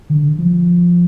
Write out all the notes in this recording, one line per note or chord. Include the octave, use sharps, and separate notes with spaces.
D3
F3